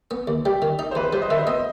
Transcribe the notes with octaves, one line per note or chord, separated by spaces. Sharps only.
B3
D#2
G3 G4
D#3
D#4
C5
E2 B4
G3 C5
D#5
D#3 E5
C5
B3 D#5